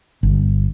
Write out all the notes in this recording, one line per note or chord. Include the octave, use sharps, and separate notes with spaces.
G1